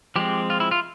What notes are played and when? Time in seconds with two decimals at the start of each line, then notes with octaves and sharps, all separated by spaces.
0.16 F3 G#3 C4 G4
0.50 F4
0.60 E4
0.71 F4